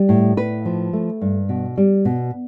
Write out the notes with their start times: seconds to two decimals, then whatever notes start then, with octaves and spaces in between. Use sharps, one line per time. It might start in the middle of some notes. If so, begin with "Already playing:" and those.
Already playing: G3
0.09 A2
0.37 A2 B4
0.65 F3
0.93 A3
1.21 G2
1.49 B2
1.77 G3
2.05 B2